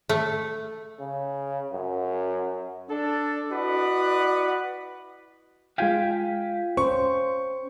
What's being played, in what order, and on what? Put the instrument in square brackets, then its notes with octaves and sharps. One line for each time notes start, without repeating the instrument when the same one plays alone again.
[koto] A3
[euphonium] C#3
F#2
[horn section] D4 A4
E4 F#4 B4 D5 D#5 F#5
[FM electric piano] G#3 F4 B6 [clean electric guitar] F5 G5 G#5
[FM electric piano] C#4 [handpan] C5 [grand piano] C#6